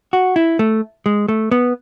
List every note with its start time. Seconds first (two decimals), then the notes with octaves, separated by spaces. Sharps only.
0.13 F#4
0.36 E4
0.59 A3
1.06 G#3
1.29 A3
1.51 B3